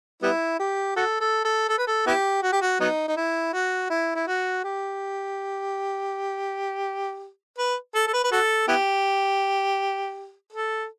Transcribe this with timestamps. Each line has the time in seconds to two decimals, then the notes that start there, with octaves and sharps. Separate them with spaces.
0.22 G3 B3 E4
0.59 G4
0.96 F#4 A4
1.21 A4
1.45 A4
1.69 A4
1.78 B4
1.87 A4
2.06 B3 E4 G4
2.43 F#4
2.52 G4
2.62 F#4
2.80 F#3 B3 D#4
3.08 D#4
3.17 E4
3.53 F#4
3.90 E4
4.16 E4
4.27 F#4
4.64 G4
7.59 B4
7.95 A4
8.07 A4
8.14 B4
8.24 B4
8.32 F#4 A4
8.68 B3 E4 G4
10.52 A4